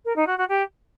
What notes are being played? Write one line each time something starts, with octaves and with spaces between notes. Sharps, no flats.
A#4
D#4
F#4
F#4
G4